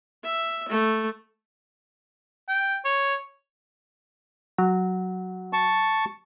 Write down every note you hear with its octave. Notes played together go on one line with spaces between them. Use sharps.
E5
A3
G5
C#5
F#3
A5 C#6